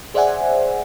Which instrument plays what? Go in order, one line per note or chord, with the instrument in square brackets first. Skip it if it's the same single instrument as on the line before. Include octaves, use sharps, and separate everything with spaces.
[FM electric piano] G#4 C5 D5 E5 F#5 G#5